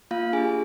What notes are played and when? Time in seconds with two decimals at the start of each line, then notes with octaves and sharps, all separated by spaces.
0.11 A#3 F4 F5
0.33 D4 G4 G#4 G#5